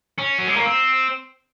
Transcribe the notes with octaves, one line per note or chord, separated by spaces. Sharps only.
C#4
F#3
G#3
A#3
C4